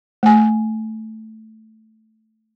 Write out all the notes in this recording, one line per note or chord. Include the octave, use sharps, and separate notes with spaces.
A3 G#5